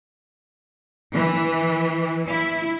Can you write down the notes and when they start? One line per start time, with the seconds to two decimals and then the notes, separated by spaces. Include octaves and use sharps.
1.13 E3
2.25 E4